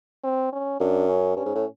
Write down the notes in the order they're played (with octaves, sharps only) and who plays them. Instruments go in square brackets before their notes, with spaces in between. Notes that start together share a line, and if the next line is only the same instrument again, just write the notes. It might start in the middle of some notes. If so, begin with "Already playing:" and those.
[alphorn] C4
C#4
[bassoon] F#2 [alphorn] D4
[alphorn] C#4
[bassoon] G2 [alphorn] C#4
[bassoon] G#2
A2